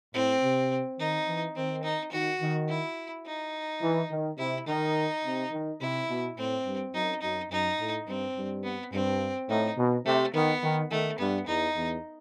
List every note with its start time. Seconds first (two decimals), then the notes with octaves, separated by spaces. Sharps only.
0.14 A2 C4
0.42 C3
0.99 D#3 D#4
1.27 E3
1.55 D#3 C4
1.83 D#4
2.12 D#3 F#4
2.41 D#3
2.69 E4
3.26 D#4
3.81 E3
4.11 D#3
4.38 C3 E4
4.66 D#3 D#4
5.24 C3
5.52 D#3
5.80 C3 E4
6.09 B2
6.37 A2 C4
6.65 G2
6.93 F#2 D#4
7.21 F#2 D#4
7.50 F#2 D#4
7.79 A2
8.07 G2 C4
8.36 G2
8.64 B3
8.92 G2 C4
9.49 A2 D#4
9.77 B2
10.05 C3 A3
10.33 D#3 B3
10.62 D#3
10.91 D#3 A3
11.18 G2 B3
11.47 E2 D#4
11.76 E2